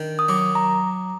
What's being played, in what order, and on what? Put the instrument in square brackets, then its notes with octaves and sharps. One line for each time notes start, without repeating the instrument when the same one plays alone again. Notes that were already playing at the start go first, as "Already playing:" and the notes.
Already playing: [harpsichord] D#3 D4
[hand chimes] D#6
[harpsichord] F#3 [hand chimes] D6
[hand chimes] A#5